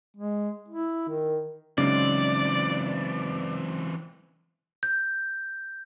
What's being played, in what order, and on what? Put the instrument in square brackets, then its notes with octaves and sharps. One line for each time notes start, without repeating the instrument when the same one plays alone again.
[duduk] G#3
E4
D#3
[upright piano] C#3 [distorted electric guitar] E3 C4 [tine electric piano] F#3 G#3 D#4 [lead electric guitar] D5
[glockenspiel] G6